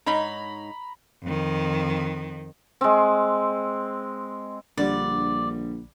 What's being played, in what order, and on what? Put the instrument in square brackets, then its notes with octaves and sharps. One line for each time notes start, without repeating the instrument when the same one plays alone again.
[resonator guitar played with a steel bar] G#2 D#4 C#5 [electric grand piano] A#5 B5
[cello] F2 D#3
[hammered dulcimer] G#3 C4
[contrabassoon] A#1 [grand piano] D3 G3 [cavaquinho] D5